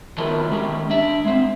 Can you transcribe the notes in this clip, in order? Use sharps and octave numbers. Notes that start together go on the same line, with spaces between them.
D#3 F3 F#3 B3 E4 A#4
D#3 G#3 C#4 G4
D4 E5
G#3 C4